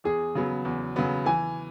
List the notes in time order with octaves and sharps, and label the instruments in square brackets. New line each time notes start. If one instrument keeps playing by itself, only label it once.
[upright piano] E2 [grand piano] G#4
[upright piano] C#3 F#3 B3
E2
C#3 F#3 B3
[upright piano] E3 [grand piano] G#5